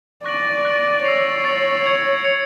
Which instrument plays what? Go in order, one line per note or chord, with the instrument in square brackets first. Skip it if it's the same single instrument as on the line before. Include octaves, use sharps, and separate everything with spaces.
[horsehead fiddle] D5 [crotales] C#6 F#6 A#6 D7 F#7
[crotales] C#6 F#6 A#6 D7 F#7
[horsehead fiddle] C#5 [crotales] E6 A6 C7 F7
[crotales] E6 A6 C7 F7
G#6 C#7 F7
G#6 C#7 F7